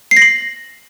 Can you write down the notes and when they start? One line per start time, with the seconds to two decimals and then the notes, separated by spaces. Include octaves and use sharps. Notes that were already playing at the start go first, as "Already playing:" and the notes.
0.11 C7
0.17 A#6
0.22 F#7